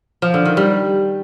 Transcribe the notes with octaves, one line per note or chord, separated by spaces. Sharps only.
F3
D3
D#3
G3